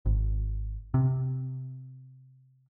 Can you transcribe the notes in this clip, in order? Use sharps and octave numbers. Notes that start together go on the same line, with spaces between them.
G#1
C3